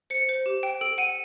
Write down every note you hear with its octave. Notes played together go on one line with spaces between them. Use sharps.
C5 C#7
C5
G4
G5
A4 D7
F#5 D#7